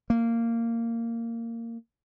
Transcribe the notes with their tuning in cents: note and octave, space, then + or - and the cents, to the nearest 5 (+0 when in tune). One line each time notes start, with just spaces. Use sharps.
A#3 -15